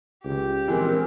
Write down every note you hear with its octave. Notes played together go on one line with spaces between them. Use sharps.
C#2 G4
A#1 E3 G#3 C4 A#4